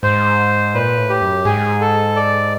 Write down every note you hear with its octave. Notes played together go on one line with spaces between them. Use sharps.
G#2 C5
A#2 B4
A2
G4
F#2
G#2 G#4
A4
D5